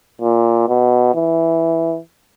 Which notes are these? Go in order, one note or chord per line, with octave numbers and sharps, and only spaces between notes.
A#2
B2
E3